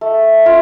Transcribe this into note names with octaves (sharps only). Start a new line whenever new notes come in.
A3
F4